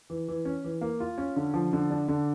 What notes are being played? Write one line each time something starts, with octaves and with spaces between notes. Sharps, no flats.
E3
E3
C#4
E3
A#3
F4
C#4
D3
F3
D3
D4
D3